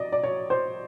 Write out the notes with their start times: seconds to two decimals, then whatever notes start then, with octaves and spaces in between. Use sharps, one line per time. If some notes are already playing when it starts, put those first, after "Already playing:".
Already playing: D5 D#5
0.12 D5
0.23 C#5
0.50 C5